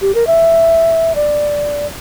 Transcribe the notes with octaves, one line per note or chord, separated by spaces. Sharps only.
G4
A#4
E5
D5